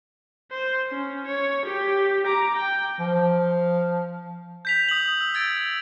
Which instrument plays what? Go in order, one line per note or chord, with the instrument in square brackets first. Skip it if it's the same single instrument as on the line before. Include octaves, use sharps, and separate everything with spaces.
[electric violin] C5
C#4
C#5
G4
A#5 D6
G5
[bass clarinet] F3
[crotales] G6 B6 F7
D#6 F#7
E6
E6 G#6 A6 D7